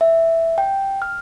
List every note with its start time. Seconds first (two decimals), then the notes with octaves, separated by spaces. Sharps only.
0.01 E5
0.58 G5
1.02 F6